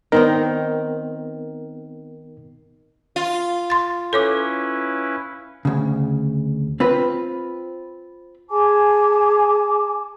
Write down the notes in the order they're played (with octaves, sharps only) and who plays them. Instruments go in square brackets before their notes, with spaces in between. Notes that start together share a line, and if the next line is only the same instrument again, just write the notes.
[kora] D#3 C4 D#4 [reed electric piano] B3 A#4
[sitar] F4
[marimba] C6 A6
[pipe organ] C#4 E4 B4 [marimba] A4 C#5 D6
[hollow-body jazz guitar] D2 C#3
C4 F4 B4
[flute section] G#4 G#5 A5 D6